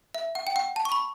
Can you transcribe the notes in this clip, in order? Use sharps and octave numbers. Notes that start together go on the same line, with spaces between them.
E5
F#5
G5
F#5
A5
C#6
B5